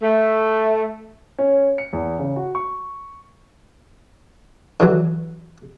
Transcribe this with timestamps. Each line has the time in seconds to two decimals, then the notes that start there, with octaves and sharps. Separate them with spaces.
0.03 A3
1.38 C#4
1.78 C#7
1.93 E2
2.19 C#3
2.36 F#4
2.55 C#6
4.80 D3 E3 F#3